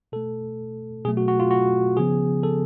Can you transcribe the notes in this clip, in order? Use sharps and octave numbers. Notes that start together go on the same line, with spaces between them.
B2 A3 A4
B2 F#3 A3 G#4
F#4
F#4
F4
F#4
C#3 F3 B3 G#4
A4